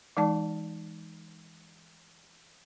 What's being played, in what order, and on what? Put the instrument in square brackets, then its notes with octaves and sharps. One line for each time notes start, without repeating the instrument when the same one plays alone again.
[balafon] E3 G#3 D#4 D5 A5